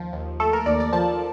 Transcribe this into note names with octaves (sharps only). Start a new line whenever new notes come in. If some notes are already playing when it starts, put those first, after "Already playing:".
Already playing: D#2 F3
D#2
A3 A4
A#4
D#2 D5
D5
F3 A5